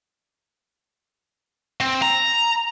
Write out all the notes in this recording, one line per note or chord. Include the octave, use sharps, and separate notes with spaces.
C4
A#5